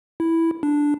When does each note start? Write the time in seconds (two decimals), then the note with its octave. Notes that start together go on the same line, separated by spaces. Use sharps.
0.20 E4
0.63 D4